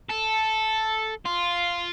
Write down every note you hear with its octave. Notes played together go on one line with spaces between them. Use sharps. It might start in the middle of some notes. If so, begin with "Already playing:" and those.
A4
F4